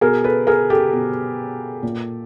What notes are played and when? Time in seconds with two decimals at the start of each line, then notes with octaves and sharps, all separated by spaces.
0.01 B2 G#4 A#4
0.24 A4 B4
0.47 G#4 A#4
0.70 G4 A4
0.93 B2
1.83 A#2